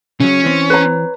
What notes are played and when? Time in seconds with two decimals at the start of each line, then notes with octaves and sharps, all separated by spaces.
0.20 C#3 F#3 C#4
0.44 E3 C4
0.70 B4 C#5 A#5